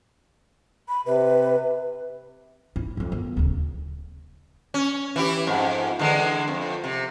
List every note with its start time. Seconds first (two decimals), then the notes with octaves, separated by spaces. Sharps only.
0.88 B5
1.06 C3 B4
2.76 E4
2.97 B1 F2
3.12 D#3 B3
3.37 D1 C#3
4.74 C#4
5.16 E3 E4 G4
5.47 F2 G#2
5.99 D3 E3 G#3
6.48 F2
6.84 C3